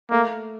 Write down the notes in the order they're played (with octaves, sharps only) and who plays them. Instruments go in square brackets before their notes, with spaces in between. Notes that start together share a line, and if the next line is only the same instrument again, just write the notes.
[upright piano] A3 [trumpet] A#3